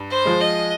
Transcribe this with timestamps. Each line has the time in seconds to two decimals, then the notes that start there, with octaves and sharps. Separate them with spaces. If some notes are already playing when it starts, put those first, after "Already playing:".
Already playing: G2
0.11 C5
0.25 F3 G#3
0.41 D#5